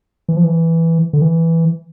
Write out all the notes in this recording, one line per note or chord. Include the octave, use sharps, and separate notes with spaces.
E3
F3
E3
D3
E3